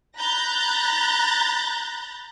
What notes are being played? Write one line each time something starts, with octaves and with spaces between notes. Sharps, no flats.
A#5 B5 F#6 G6 A6 A#6